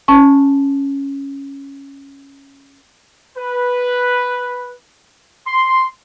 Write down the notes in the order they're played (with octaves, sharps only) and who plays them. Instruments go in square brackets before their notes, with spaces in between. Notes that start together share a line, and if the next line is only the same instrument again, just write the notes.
[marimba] C#4 A5 C#6
[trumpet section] B4
C6